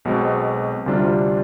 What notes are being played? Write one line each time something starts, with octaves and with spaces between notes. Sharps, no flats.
B1 B2 G#3 C4
D2 C3 G3 D4 F4